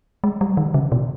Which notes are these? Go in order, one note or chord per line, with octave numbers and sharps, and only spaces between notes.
G#3
G3
D#3
C#3
B2